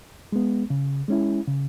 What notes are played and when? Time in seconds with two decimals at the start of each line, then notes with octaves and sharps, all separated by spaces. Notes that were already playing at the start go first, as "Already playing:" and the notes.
0.32 G#3 B3
0.70 C#3
1.08 G#3 C#4 E4
1.47 C#3